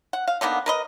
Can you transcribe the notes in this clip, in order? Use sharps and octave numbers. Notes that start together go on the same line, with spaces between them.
F#5
F5
D3 D#3 A#3 B3
A#4 B4 D#5